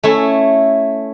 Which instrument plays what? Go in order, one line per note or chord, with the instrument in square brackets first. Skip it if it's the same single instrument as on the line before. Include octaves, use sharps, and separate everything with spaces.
[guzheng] A3 C#4 E4